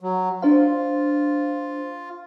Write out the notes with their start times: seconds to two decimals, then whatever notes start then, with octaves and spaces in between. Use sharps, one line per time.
0.01 F#3
0.42 D4 F4 C5 F5